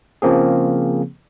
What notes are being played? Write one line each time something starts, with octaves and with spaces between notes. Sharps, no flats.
C#3 F3 A#3 C4 G#4